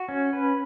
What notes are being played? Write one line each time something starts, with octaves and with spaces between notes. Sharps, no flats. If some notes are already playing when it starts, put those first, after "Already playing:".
Already playing: F#4
C#4
B4